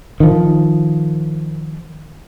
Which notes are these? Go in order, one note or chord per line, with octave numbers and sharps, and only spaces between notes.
D#3 F3